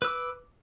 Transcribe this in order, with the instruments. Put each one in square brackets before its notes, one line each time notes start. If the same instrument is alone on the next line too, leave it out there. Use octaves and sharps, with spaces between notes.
[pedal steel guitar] B4
E6
D6